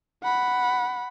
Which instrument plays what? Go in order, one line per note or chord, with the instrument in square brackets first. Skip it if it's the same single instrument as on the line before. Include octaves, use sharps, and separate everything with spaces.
[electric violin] F#5 B5